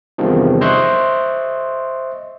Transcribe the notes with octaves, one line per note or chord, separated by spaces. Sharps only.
E2 G2 C3 D#3 F3
C5 D#5 E5 C6 C#6 F#6